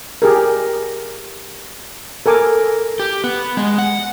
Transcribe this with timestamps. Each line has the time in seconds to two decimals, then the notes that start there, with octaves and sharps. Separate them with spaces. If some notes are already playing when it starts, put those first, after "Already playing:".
0.22 G4 G#4 A#4
2.26 A4 A#4 G#5 D6
3.00 G4
3.24 B3
3.57 G#3
3.78 F#5